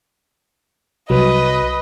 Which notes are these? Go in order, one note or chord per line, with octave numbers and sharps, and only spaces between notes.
C2 F#3 B4 D#5